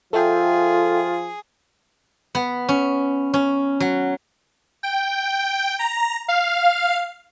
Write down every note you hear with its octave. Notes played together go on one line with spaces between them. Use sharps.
F3 F4 G#4 A4 E5 G5
B3
C#4
C#4
F#3
G5
A#5
F5